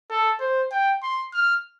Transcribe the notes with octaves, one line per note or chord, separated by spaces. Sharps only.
A4
C5
G5
C6
F6